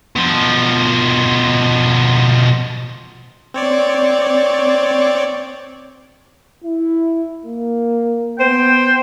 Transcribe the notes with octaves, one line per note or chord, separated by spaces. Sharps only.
B2 F3
C4 C#5 D5
E4
A#3
B3 C5 G5